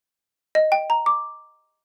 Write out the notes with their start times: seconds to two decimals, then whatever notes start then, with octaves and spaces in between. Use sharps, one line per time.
0.55 D#5
0.72 G5
0.90 A#5
1.06 D6